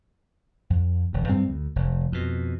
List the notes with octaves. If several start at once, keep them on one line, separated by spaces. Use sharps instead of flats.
F2
E1 D2
G2 G3 C4
D2
F1
F2 B2